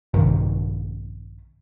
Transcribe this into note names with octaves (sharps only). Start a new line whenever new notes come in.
A#1 G2 C3 D#3